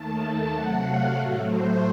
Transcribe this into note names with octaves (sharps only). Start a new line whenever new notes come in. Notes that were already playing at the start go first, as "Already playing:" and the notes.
Already playing: D#2 D#3 A3 A5
A5
C3 F#3 A3 F#5
F5
A2 F#3 A3
C5